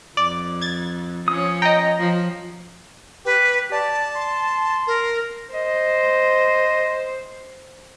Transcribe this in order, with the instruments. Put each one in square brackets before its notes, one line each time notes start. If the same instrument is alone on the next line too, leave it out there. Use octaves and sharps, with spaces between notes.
[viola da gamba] F2 [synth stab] D5
[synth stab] G#6 A6
[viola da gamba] F3 C#4 C#5 [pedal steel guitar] D#6
[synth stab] D#5 G5 [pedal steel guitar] A#5
[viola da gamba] F3
[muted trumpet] G4 [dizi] B4
[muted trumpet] D5 [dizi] A5
[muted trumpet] C6
[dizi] A#4
[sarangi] C5 [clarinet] D#5